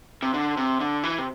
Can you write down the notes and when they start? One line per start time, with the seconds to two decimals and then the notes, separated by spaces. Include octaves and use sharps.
0.22 C3
0.34 D3
0.57 C3
0.80 D3
1.04 E3
1.18 C3